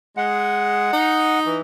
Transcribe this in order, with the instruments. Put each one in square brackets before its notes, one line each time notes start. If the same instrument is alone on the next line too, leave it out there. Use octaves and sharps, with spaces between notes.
[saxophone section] G#3 [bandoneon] F#5
[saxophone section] D#4
[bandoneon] E3